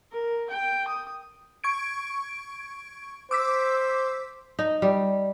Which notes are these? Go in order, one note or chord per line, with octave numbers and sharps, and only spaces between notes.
A#4
G5
D#6
C#6 G#6 D7
C5 D6 E6 B6
D#4
G3